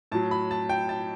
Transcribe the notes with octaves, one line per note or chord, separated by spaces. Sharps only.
A2 F#3 A5
B5
A5
G5
A5